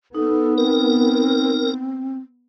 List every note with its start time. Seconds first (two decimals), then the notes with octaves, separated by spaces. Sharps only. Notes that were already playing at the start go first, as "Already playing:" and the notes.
0.15 B3 D#4 A4
0.58 C4 A#4